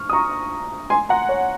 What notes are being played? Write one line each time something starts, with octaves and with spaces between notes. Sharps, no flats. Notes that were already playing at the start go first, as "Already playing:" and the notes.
Already playing: C#6 F6
D#6
A#5 C#6
G#5 C6
F#5 A#5
C#5